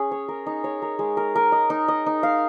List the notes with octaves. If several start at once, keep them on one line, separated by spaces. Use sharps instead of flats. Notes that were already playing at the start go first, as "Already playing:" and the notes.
Already playing: C#4 G#4
C#5
A#4
D#4
C#5
A#4
G#3
A#4
A#4
D#5
D#4
D#5
D#4
F5